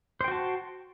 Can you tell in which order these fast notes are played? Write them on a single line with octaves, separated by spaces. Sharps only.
C5 G5 F#4 A5